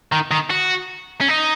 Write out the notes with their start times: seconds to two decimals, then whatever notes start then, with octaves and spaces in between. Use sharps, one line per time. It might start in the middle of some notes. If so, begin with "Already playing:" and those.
0.12 D#3
0.31 D#3
0.50 F#4
1.21 C#4
1.28 D#4